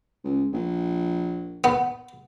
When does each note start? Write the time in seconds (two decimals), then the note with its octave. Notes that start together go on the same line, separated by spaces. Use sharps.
0.24 C#2
0.53 A#1
1.64 B3